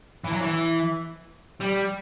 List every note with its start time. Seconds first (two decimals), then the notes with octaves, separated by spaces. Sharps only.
0.25 E3
0.33 F#3
0.41 E3
1.61 G3